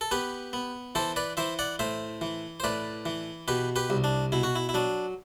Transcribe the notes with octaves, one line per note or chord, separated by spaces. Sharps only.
A4
B3 G4 B4
B3
E3 A4 C5
B4 D5
E3 C5 E5
D5 F#5
A2 C5 E5
E3
C5
A2 B4 D5
E3
B2 G4 B4
G4 B4
C2
D4
B2 E4
F#4
E4
E4
F#3 D4